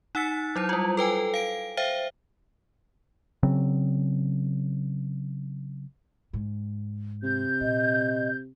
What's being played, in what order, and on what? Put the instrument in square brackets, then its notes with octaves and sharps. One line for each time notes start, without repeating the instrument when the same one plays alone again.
[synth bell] D#4 F#5 E6 A6 C#7
F#3 E4 C5
G3 F4
A4 B4 G5 G#5
F5 D7
C5 E5 F5 G5
[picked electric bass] C#3 F#3 C4
[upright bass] G#2
[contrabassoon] C3 [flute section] G6
[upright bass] A#2 [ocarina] D#5